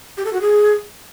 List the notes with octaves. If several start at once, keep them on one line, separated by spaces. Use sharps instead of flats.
G4
A4
F#4
G#4